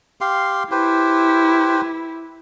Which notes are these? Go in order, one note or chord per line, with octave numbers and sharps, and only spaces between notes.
G4 F5 C6
E4 G4 B4 C5